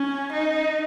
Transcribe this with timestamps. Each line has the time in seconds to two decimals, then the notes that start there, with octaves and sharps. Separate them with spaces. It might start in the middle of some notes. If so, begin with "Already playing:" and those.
Already playing: C#4
0.33 D#4